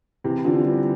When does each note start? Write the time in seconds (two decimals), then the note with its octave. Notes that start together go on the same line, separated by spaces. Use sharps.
0.24 C3 E3
0.45 D3 F3
0.65 E3 G3